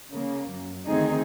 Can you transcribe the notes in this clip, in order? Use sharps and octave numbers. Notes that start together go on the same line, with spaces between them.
C#3 A#3
F#2
D2 D#3 C4 D#4 G#4